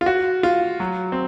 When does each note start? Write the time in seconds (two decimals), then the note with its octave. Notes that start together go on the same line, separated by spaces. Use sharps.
0.01 F4
0.06 F#4
0.43 F4
0.80 F#3
1.12 C4